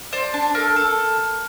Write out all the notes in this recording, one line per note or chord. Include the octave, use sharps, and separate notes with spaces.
D4 C5
D4
A4 A#4
A4